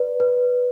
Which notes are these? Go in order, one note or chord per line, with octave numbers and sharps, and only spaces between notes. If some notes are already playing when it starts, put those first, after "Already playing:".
Already playing: B4 D5
B4